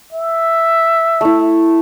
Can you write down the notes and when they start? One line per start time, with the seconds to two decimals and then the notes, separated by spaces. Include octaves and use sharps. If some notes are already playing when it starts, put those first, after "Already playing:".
0.12 E5
1.21 A3 E4